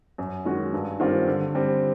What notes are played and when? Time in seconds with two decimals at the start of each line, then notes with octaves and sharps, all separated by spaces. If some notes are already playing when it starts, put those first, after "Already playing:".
0.18 F#2
0.45 D#3 G#3 C#4 F#4
0.73 G2
1.00 D#3 G3 C4 F4
1.27 D3
1.55 G3 C4